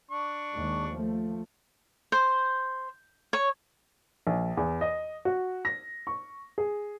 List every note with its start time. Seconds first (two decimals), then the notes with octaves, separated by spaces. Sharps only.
0.11 D4 C#6
0.54 D#2 D#3 G#3
0.91 F3 A3
2.12 C5
3.33 C#5
4.27 A#1
4.57 E2
4.81 D#5
5.25 F#4
5.65 A#6
6.07 C#6
6.58 G#4